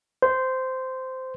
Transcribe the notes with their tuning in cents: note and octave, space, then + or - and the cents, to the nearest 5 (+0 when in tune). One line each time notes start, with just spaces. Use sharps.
C5 -10